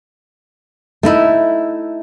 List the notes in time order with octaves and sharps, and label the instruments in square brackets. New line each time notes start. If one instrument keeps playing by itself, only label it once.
[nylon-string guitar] A3 D#4 E4